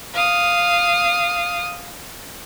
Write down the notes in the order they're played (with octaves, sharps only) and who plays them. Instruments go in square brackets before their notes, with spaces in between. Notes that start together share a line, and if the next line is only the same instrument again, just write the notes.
[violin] F5 D#6